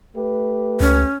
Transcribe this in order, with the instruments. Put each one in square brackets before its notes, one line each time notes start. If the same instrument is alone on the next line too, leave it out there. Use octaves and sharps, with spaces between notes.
[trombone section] A3 G4 B4
[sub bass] C#2 [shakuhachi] C#4